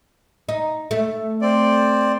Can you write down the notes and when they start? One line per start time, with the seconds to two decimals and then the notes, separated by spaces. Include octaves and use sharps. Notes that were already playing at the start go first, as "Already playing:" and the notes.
0.49 D#4
0.91 A3
1.42 C4 D5